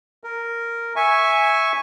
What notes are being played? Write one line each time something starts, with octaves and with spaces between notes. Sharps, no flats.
A#4
E5 G#5 C#6